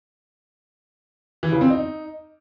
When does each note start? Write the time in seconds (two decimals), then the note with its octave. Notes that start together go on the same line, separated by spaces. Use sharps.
1.43 E3
1.52 C#3
1.61 C4
1.70 D#4